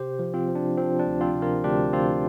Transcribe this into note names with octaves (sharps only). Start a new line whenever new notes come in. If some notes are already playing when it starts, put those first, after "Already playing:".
Already playing: C3 G4 C5
F3
C4 F4
F3
D4
F3 C4
D4
D2
C4 F4
C3
F4 A#4
D2 D4 G4
D2 C4 F4